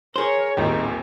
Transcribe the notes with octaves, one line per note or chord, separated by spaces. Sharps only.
G#4 A#4 C5 C#5
D#1 A1 D#2 D#3 C4